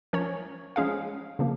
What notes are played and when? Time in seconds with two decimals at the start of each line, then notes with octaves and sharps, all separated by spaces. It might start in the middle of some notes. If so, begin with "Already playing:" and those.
0.13 F3 C#4 A#4 C#5
0.76 F3 G#3 C#4 G#4 F5
1.39 C#3 F3 A#3